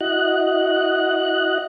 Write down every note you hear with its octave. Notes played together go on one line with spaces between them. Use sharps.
E4 F#4 D#5 F#6